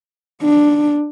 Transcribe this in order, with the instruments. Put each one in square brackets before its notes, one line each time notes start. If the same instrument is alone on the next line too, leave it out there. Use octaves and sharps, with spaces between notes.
[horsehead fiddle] D4